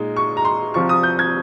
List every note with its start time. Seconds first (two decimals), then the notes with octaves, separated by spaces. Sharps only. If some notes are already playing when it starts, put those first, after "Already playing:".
Already playing: A#2 G#3 D#4
0.16 C#6
0.37 A#5
0.45 C6
0.74 C2 C3 F3 C4 F4 C#6
0.89 D#6
1.03 G6
1.19 G#6